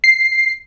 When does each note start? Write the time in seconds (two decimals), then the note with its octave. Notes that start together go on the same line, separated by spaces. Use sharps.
0.04 C7